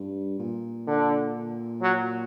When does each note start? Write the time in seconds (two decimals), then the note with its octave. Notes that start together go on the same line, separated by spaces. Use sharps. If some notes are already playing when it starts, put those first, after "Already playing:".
Already playing: G2
0.39 A#2
0.87 D3
1.82 F#3